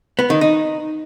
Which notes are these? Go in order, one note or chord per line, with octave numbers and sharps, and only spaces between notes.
B3
D#3
D#4